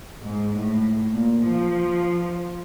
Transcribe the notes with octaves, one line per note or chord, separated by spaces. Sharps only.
G#2
A2
A#2
F3